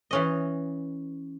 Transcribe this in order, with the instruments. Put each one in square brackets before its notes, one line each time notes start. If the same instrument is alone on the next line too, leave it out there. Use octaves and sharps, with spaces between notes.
[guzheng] E3 C#4 D#5